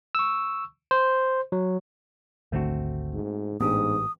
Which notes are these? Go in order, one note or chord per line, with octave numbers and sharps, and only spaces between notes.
C#6 E6
C5
F#3
G#1 D2 D3 A3 C4 F#4
G#2
A1 G#2 B3 D4 G4 D#6